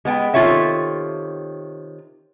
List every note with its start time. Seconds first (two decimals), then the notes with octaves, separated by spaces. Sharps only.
0.05 G#3 B3 G5
0.34 C3 D#3 F4 A4 C#5 E5